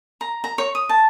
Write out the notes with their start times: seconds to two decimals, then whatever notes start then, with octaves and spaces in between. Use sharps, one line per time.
0.21 A#5
0.44 A#5
0.58 C#5
0.75 D#6
0.89 A5